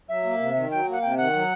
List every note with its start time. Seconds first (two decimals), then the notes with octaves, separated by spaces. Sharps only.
0.09 F#3 E5
0.24 A#3
0.39 C3
0.55 D#3
0.70 F#3 G5
0.87 A#3
0.92 F#5
1.02 C3 G5
1.17 D#3 F#5
1.33 F#3